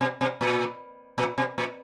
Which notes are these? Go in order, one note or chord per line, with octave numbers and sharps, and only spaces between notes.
B2
B2
A#2
A#2
B2
A#2